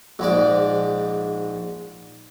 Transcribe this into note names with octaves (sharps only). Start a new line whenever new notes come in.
A#1 G#2 D5